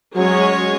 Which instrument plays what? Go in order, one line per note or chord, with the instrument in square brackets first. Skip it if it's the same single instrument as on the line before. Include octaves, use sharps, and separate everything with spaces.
[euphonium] F#3 [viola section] G#3 C#4 G#4 C#5